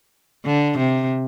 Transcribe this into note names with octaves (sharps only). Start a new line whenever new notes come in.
D3
C3